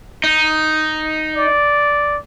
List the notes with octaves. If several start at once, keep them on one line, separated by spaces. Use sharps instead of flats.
D#4
D5